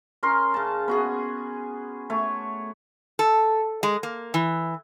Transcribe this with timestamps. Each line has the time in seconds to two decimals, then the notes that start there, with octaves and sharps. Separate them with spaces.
0.23 C#4 A#4 C6
0.54 C#3 A5
0.88 B3 F#4 G#4
2.10 A3 C#5
3.19 A4
3.83 G#3
4.03 A#3
4.34 E3